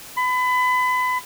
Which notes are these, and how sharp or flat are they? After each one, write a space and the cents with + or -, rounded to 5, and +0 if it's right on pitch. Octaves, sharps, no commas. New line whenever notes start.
B5 +30